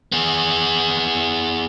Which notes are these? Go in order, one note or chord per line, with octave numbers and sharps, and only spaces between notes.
B3 G#4